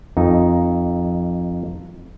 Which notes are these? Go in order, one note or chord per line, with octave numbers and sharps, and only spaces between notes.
F2 D#4